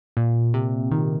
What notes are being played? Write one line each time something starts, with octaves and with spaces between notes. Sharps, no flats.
A#2
C3
D#3